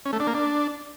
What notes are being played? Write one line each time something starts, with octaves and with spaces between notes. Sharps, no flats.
C#4
A3
D4
A#3
D4